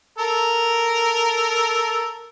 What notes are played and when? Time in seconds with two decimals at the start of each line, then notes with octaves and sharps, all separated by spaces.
0.18 A4 A#4